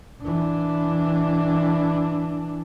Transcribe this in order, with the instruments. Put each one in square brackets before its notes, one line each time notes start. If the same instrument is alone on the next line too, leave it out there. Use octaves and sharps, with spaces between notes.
[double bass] E3 D4